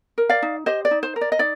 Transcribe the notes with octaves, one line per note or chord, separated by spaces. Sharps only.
A#4
D5 F5
D#4
G4 C5 D#5
D5
D#4
C5
A#4
D5
D#5
D#4 D5